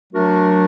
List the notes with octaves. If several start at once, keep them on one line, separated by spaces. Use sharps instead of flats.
F#3 A3 D4 F#4 A#4